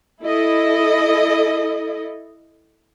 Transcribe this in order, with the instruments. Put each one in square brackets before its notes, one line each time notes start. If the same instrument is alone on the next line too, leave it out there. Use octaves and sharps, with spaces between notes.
[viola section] E4 A4 D#5